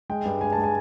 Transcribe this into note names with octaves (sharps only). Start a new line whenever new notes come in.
G#3 G5
G2
G#3 G#5
A5
G#3
G#5